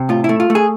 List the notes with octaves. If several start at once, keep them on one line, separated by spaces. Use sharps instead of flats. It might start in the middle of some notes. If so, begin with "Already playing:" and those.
Already playing: C3
A2 F4
E4
A3
F4
A3
G#4